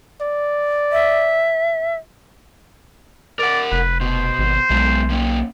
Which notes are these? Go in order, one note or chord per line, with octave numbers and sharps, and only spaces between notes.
D5
E5
A#4 D5 F#5
F1 B4
B2 C5
G#1
B1 G#3 B3
A#3 C#4